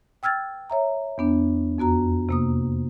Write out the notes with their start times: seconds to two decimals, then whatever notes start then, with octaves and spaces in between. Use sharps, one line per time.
0.23 G5 E6 F6 G#6 A6
0.70 C#5 E5 A#5
1.18 E2 B3 D4
1.78 F2 B3 F#4 A#5
2.29 C3 A#3 D#6